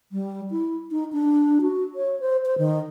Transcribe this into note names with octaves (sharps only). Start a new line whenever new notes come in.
G3
E4
D#4
D4
F#4
C#5
C5
C5
D#3